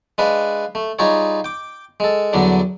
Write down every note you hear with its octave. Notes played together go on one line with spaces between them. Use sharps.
G#3 D4 B4 F5
A3
G3 D#4 F4 G#4 C#5
G5 D6
G#3 A4
E2 D3 F#3 G3 D4